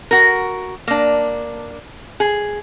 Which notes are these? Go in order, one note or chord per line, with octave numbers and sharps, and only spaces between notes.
F#4 A#4
A#3 D4
G#4